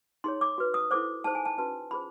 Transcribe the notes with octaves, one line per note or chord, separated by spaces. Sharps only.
D#4 G#4 C#5 C6
D6
F#4 B4
D#6
E4 A4 C5 D6
D#4 G#4 C5 A5
G#5
A5
C#4 F#4 B4 A5
F4 G#4 C5 B5